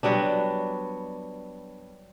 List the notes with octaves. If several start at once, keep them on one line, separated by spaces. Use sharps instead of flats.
F#3 G3 B3 D4